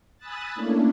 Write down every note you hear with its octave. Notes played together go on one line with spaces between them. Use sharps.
G#5 B5 D#6 E6 F#6 A6
A3 A#3 C#4 D4 E4